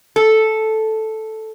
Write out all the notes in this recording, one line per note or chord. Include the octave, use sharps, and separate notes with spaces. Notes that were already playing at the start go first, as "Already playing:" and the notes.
A4